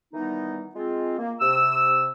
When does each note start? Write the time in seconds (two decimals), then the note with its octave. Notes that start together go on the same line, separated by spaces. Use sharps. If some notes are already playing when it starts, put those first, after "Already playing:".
0.14 D#3 E3 G3 B3 D#4
0.75 G#3 C4 F4
1.19 A#3
1.40 C3 E6